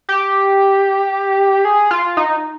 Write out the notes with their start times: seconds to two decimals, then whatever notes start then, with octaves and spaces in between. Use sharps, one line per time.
0.09 G4
1.65 G#4
1.91 F4
2.17 D#4